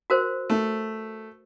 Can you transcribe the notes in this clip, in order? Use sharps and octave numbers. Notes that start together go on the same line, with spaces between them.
F#4 A#4 C5
A3